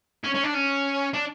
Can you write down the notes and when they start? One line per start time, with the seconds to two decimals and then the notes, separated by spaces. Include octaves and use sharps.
0.24 C#4
0.34 C#4
0.44 D4
0.54 C#4
1.13 D4